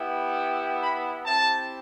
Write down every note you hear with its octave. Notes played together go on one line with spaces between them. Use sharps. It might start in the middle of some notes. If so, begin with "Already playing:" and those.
Already playing: B3 E4 G4
B5
C4 E4 G4 A5